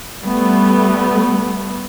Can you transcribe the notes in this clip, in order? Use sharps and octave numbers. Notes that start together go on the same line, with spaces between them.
G3 A3 B3